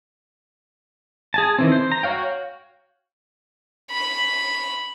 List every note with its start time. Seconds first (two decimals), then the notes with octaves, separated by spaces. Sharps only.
1.34 G#4 G#5 A5
1.59 D#3 E3 C4
1.72 C5
1.92 A#5
2.03 F#4 C#5 F5 G5
3.91 B5